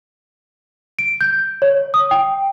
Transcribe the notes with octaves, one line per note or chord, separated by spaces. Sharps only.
D7
G6
C#5
D#6
G5